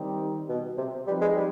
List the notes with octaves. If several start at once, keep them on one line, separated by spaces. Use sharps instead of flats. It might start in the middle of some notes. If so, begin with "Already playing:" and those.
Already playing: D#3 G3 C4 D#4 G4
B2
C3
F3 G3 C4 D#4 B4
G#3
G3